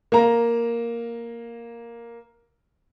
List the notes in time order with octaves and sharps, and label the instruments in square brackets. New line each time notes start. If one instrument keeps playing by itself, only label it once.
[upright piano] A#3 A#5